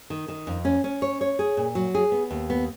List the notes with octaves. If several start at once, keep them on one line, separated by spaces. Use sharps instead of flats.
D#3
D#3
F2
C#4
C#4
C#5
C#5
G#4
A#2
F#3
G#4
B3
D#2
B3